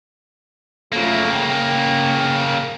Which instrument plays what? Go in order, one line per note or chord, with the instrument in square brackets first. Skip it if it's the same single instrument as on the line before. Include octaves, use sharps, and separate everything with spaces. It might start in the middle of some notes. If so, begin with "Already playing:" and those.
[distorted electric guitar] C#3 A#3 [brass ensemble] F3 F#3 A3
[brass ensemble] G5